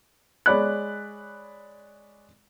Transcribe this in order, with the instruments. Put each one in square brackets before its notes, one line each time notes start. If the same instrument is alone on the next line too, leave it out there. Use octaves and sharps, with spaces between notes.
[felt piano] G#3 C#5 D5 B5 F#6